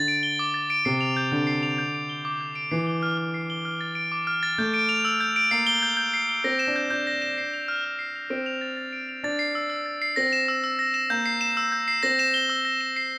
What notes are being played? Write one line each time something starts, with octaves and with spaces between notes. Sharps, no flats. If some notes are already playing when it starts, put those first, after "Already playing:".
Already playing: D3 A6
D7
G7
D6
A6
D7
C3 C7
F7
G6
D3 G6
C7
F7
G6
D7
G7
D6
G6
D7
E3 C7
G7
F6
F6
C7
G7
F6
A6
D7
D6
F6
A6
A3 G6
D7
F7
E6
G6
D7
A#3 C7
G7
G6
G6
C7
G7
C4 A#6
E7
D4
G6
D4 G6
A#6
E7
C7
F7
F6
F6
C7
F7
C4 D7
F7
A6
A6
D7
F7
D4 A6
C7
E6
E6
A6
C7
C4 A#6
E7
E6
E6
A#6
E7
A#3 G6
C7
E7
E6
G6
C7
C4 A#6
E7
G7
E6
A#6
E7
C7